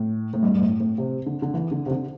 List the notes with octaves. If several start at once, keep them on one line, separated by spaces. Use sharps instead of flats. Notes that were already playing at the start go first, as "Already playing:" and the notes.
Already playing: A2
A2
G2
G2
A2
A2
C3
D3
D3
E3
D3
C3
D3